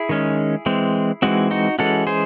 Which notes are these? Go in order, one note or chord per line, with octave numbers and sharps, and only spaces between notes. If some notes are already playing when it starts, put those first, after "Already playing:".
Already playing: E4 G#4
D#3 G#3 C#4
E3 G#3 C4
E3 G#3 C4 D#4 F#4
D#4 F#4
E3 G#3 C#4 F#4 A4
G#4 C5